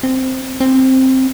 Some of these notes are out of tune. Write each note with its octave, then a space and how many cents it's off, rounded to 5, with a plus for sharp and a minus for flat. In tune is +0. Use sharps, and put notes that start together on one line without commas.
C4 -5
C4 +5